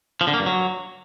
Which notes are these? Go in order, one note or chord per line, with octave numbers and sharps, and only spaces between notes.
F3
D3
A#3
G2
F#3